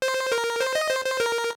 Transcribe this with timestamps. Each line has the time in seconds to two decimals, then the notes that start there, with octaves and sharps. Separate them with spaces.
0.02 C5
0.32 A#4
0.60 C5
0.75 D#5
0.90 C5
1.05 C5
1.20 A#4